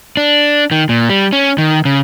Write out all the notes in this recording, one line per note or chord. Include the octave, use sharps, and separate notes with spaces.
D4
D#3
A#2
G3
C#4
D#3
C#3